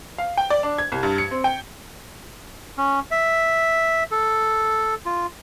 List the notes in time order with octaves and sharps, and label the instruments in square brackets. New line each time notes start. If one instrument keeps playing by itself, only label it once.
[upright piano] F5
G5
D5
D4
G#6
C2
G2
C#7
C4
G5
[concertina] C#4
E5
A4
F4